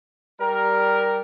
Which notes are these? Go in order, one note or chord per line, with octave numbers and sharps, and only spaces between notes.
G3 A#4